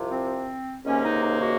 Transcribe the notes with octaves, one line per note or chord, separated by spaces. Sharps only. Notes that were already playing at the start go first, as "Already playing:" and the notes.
Already playing: C2 C3 F3
C4
C#2 C3 D#3 A#3 C#4
D#4
D#4
F#4